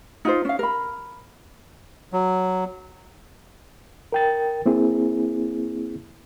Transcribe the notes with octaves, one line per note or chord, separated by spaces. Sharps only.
D#4 F4 C5
C#4 F5
A#4 B5
F#3
A#4 G5 A6
A#3 C4 E4 G#4